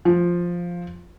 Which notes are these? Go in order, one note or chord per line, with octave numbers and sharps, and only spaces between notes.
F3